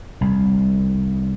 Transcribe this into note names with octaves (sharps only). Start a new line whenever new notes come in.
C2